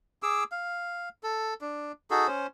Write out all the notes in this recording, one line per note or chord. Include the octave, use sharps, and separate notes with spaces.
G#4 D6 E6
F5
A4
D4
D#4 F#4 G#4 A4
C#4 C5